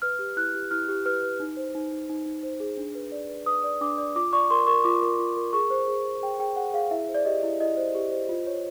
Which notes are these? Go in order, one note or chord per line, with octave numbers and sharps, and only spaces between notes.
B4 F6
G4
E4 F#6
G4
E4 F6
G4
B4 F6
B4
D#4
C5
D#4
D#4
D#4
D#4
C5
G#4
D4
B4
D5
B4
B4 D#6
D5
D4 D6
D5
F4 D6
D5 C#6
A#4 C6
A#4 C#6
F4 D6
A#4
F4
A#4
G#4 C#6
C5
G#4
G#4
G#4 G5
G#4 G5
G#4 F#5
G#4 F5
E4 E5
C5
D5
G4 D#5
E4
E4 D#5
C5
G4
C5
F4
C#5